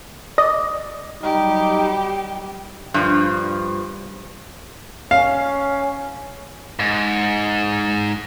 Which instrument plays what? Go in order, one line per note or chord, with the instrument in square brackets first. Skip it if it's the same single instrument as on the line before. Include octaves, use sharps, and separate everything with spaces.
[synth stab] D5 D#5
[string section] F#3 G3 [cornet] D#4 [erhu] G4
[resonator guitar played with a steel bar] G2 F3
[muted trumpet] C#4 [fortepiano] F5
[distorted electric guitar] G#2